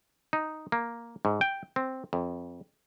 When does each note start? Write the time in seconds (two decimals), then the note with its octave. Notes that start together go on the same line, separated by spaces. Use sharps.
0.33 D#4
0.72 A#3
1.25 G#2
1.41 G5
1.76 C4
2.13 F2